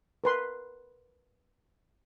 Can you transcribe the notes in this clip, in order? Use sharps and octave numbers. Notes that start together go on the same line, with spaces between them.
A#4 B4 C6